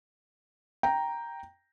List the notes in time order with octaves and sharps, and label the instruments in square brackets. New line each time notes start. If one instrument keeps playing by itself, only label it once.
[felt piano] G5 A#5